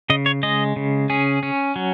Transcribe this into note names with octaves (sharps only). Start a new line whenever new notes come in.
C#3 D#5
C#5
G#3 D#5
C#3
C#4 G#4
C#4
F#3